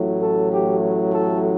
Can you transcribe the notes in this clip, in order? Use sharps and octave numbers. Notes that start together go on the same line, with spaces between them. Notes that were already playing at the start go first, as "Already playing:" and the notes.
Already playing: A1 A2 F#3 A3
A4
G4
A4